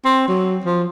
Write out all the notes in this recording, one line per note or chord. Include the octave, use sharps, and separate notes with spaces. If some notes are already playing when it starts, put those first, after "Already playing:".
C4
F#3
F3